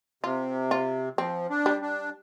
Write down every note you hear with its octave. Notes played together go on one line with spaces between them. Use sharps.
C3 F4
F4
F3 C4
D4
G3
D4